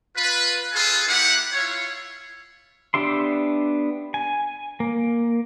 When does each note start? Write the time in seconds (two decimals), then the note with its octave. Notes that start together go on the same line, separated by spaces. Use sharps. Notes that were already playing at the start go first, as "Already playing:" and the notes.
0.16 F4 B4
0.72 F4 G#4 A4 B4 G#5
1.07 A#3 E4 G4 F#5
1.53 E4 F4 C#5
2.94 B3 D4 G4 E5 C6
4.14 G#5
4.80 A#3